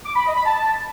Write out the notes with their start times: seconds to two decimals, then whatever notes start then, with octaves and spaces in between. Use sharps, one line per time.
0.06 D6
0.16 B5
0.26 D#5
0.36 B5
0.46 A5